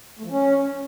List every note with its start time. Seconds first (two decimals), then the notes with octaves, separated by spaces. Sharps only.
0.19 A3
0.25 F3
0.31 C#4